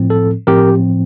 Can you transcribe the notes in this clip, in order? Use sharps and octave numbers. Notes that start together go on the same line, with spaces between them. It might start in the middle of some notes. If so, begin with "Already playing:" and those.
Already playing: A2 F3 C4
A4
A2 F3 C4 G4 A#4